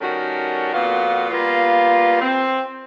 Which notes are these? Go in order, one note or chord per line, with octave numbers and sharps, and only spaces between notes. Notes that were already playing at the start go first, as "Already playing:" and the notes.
D#3 G3 A3 C#4 F#4 A#4
F2 A#2 B3 F4 F#4 F5
G3 A#3 B3 F4
C4